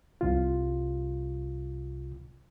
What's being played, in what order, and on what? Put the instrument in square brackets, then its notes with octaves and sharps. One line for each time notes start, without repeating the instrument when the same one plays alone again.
[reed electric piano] C2 C3 F4